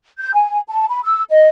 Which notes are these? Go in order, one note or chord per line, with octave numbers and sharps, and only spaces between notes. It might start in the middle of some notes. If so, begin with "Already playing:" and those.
G6
G#5
A5
B5
E6
D#5